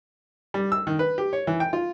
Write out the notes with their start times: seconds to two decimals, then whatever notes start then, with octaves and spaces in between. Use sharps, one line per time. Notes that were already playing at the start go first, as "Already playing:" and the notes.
0.54 G3
0.72 E6
0.87 D#3
0.99 B4
1.18 G4
1.33 C#5
1.47 E3
1.60 G5
1.73 F4